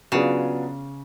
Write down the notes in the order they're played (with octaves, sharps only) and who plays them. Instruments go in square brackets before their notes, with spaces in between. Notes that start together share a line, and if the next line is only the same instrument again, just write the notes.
[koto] C#3 [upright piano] F#3 B3 D4 F4 G#4